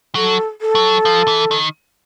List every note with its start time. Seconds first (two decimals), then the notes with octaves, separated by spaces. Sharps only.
0.15 F#3 A4
0.61 A4
0.75 F#3
1.05 F3
1.28 E3
1.51 D#3